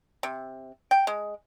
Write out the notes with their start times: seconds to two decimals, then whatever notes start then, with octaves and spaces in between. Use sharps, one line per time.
0.23 C3
0.91 G5
1.07 G#3